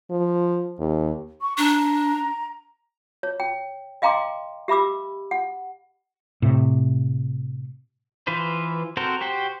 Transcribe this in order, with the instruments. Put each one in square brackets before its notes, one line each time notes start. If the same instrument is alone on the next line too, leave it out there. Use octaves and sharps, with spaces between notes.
[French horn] F3
D#2
[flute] C#6
[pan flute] D4 [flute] A#5
[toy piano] C#5
G5
D#5 F5 G5 A#5 C6 D6
G4 E5 B5 D6 E6
F#5
[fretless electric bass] A2 C3
[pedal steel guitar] E3 F4 B4 C5
C4 F#4 A4 A#4 C5
F#4 G4 C5 G5